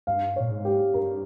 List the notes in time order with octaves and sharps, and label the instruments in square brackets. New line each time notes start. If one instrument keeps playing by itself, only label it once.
[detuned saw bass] G2 [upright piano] F5
[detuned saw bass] A#2 [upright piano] C#5
[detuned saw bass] G#2
[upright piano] G4
[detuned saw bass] G2 [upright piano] A#4